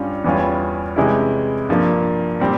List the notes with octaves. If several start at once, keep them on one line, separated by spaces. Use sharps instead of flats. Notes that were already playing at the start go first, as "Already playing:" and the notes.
Already playing: G2 G3 C#4 F4
E2 E3 G3 C#4 F4
C3 E3 G#3 C#4 E4
G2 F3 A#3
A#2 G3 C4 G4